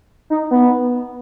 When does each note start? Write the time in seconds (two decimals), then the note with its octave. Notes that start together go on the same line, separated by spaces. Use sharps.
0.30 D#4
0.51 B3